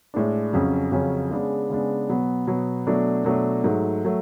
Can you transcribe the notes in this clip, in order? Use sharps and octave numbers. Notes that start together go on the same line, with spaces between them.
A2 G#3 D4
F2 C#3 F#3 C#4
F2 C#3 F#3 C#4
C#3 G#3 B3 D4
C#3 G#3 B3 D4
B2 F#3 B3
B2 F#3 B3
B2 F#3 A3 D4
B2 F#3 A3 D4
G#2 F#3 A3
F#3 A3